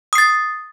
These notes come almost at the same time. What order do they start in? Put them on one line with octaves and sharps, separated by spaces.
D#6 C7 A6